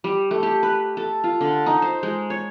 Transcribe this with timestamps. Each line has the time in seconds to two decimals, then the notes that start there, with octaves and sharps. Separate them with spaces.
0.04 G3
0.31 A3
0.43 G4
0.63 B4
0.97 A4
1.24 F4
1.41 D3
1.66 D#4
1.82 C5
2.03 G#3
2.30 C#5